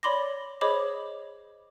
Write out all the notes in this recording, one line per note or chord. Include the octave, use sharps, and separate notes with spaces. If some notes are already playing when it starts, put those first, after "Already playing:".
C#5 D5 B5 C6 D6 A#6
G#4 C5 C#5 D#5 B5 D6